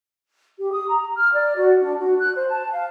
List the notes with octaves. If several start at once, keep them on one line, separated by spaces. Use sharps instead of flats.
G4
D#6
A#5
F6
D5
F#4
D4
F#4
F#6
C5
A5
F5